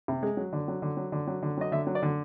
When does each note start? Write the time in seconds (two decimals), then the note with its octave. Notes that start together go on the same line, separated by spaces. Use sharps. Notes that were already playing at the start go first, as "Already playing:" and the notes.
0.08 C3
0.23 G#3
0.37 F#3
0.53 D3
0.68 F#3
0.82 D3
0.97 F#3
1.12 D3
1.27 F#3
1.42 D3
1.57 F#3 D#5
1.72 D3 E5
1.87 F#3
1.95 D5
2.02 D3